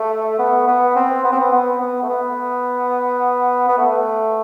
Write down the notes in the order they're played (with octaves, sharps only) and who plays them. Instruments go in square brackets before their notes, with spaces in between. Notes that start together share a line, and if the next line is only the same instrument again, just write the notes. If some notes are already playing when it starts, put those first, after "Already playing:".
Already playing: [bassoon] A3
B3
B3
C4
B3
C4
B3
B3
B3
A3
B3
B3
A3